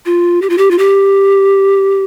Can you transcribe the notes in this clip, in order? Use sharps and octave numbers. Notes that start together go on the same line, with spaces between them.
F4
G4
F4
G4
F4
G4